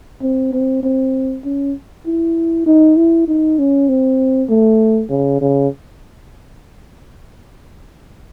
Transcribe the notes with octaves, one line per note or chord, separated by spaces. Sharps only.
C4
C4
C4
C#4
E4
D#4
E4
D#4
C#4
C4
A3
C#3
C#3